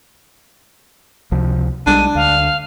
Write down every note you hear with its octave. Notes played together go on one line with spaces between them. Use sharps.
C#2 C3 F3
B1 G3 G#3 D4 D#7
D2 F5